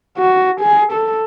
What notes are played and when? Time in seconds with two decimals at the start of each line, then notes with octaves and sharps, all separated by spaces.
0.18 F#4
0.61 G#4
0.92 A4